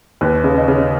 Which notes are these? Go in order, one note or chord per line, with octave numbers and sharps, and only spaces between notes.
D#2 B4
C#3
D#5
C#3